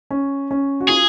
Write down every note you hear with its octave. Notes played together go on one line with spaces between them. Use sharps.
C#4
C#4
F#4
F4 G#4